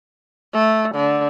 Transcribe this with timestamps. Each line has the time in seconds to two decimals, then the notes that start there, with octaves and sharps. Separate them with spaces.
0.54 A3
0.95 D3